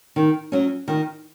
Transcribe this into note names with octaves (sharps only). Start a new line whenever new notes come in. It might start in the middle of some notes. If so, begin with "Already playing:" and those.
D#3
F#3 C#4
D#3